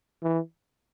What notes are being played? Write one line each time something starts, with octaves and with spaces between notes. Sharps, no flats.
E3